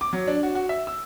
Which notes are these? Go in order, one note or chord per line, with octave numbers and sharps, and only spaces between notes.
D6
F#3
D4
F#4
F#4
E5
E6